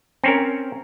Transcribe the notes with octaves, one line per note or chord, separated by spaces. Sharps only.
C4 C#4 A#4